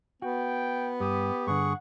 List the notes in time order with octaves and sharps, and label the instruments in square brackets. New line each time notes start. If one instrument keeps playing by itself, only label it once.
[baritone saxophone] B3 [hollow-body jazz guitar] F#4 [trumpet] G5
[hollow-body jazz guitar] G2 [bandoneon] G4 [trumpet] D#6
[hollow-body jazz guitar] G2 D3 [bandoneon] G#4 C#6 [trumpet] F#5